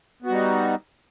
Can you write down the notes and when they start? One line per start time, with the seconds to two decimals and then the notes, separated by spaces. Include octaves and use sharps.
0.22 B3
0.26 F#4
0.29 G3
0.33 D#4